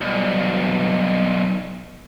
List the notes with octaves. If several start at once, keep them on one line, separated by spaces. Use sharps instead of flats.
B1 G2